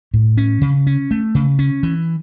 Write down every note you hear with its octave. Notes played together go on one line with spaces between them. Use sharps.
A2
C#4
C#3
C#4
A3
C#3
C#4
E3